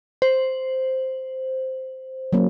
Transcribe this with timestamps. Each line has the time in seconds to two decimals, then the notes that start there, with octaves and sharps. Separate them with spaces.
0.22 C5
2.33 F#3 A#3 C#4